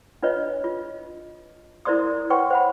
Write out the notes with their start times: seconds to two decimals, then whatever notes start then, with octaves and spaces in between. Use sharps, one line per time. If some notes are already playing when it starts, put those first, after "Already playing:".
0.23 D4 F4 B4 C#5 D#5
0.64 F4
1.85 E4 A#4 C5 D5 C6 D#6
2.30 B4 C#5 F#5 G5 C6 C#6
2.51 C5 F#5 B5